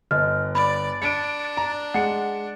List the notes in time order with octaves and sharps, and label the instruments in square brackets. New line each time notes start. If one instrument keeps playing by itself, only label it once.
[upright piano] G1 [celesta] D#5 F6
[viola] D5 [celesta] B5
[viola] D4 [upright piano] C#7 D7
[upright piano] A#5
[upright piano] G#3 C#7 [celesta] F#5